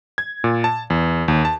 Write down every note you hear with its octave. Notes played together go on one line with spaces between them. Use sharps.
G#6
A#2
A5
E2
D#2
A5